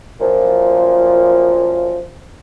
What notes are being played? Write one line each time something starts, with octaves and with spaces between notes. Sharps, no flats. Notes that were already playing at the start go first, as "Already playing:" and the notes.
F#2 A#2 F3